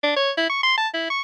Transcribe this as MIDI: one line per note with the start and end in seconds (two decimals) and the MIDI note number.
0.04 0.13 62
0.17 0.31 73
0.38 0.49 64
0.50 0.59 85
0.64 0.76 84
0.78 0.88 81
0.94 1.06 64
1.10 1.22 85